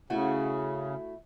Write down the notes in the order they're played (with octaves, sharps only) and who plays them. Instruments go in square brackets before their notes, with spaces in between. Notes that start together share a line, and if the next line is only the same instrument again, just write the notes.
[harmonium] C#3 [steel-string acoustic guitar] A3 E4 F#4